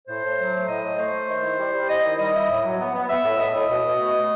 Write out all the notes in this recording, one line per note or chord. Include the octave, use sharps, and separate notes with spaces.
A2 C5
A2
F#3
A3
A2 D#5
A2
A3 C5
A3
D#3
E4
G3
G3
E4 D#5
D#3
G3 D#5
E4
A2
F#3
B3
B3
B3 E5
A2
A2 D#5
A2
B2
B2
A3
A3